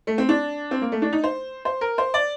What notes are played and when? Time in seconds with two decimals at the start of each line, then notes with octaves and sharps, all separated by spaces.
0.07 A3
0.18 C4
0.29 D4
0.71 C4
0.81 A#3
0.92 A3
1.02 D4
1.13 D#4
1.24 C5
1.65 C5
1.81 A#4
1.98 C5
2.14 D5